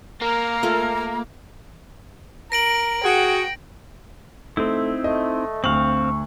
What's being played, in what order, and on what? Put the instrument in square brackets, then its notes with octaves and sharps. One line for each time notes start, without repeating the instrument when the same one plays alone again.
[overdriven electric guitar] A#3 [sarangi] A#4 [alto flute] A#5
[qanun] A3 F4 A4
[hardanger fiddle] A#4 [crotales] A#6 D7 F#7
[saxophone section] F#4 G#4 [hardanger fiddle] G5
[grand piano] A3 [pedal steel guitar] C4 D#4 E4
[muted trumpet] A3 [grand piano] D#5
[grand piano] D2 F#7 [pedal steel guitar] C4 F5 [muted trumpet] C#6